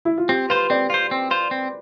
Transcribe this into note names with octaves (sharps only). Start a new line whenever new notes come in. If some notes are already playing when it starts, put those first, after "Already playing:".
E4
F4
C4 G4
F4 B4 C5
C4 D5
F4 C5
C4
F4 C5
C4